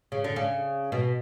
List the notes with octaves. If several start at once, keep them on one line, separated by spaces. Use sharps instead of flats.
C#3
D3
C#3
B2